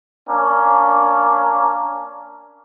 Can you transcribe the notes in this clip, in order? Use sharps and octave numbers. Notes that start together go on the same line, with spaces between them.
A#3 C#4 D4